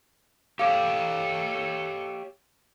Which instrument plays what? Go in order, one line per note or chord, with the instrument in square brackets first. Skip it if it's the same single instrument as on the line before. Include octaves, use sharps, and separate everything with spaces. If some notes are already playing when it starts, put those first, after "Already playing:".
[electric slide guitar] G4 C#5 G5 [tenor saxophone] A4 [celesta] F5 D6